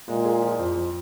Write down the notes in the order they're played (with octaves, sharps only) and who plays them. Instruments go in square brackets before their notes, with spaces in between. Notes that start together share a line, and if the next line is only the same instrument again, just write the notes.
[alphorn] A#2 [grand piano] G#3
[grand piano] G#4
F3
F2
F2